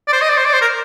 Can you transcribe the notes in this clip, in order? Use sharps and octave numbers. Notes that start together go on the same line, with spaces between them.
D5
C5
D#5
D5
C5
D5
C5
A#4